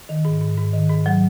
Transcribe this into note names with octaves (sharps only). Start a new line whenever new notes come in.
D#3
G#2
G#2
G#2
D#3
G#2
F#3